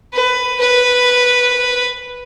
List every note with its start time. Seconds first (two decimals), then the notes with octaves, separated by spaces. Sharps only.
0.13 B4
0.60 B4